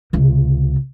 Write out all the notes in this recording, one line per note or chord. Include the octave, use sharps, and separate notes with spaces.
C#2 C3